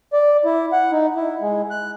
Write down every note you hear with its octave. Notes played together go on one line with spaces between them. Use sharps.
D5
E4
F#5
D#4
E4
G#3
F#6